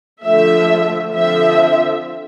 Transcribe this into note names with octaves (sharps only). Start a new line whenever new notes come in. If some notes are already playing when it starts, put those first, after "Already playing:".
D3 F3 A3 E5
D3 F3 C4 E5